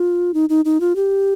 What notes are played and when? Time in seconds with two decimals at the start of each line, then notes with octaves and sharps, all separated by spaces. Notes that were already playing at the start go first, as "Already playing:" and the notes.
Already playing: F4
0.34 D#4
0.49 D#4
0.65 D#4
0.80 F4
0.96 G4